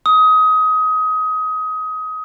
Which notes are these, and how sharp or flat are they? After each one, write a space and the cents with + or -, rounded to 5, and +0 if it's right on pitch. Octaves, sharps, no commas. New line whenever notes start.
D#6 +20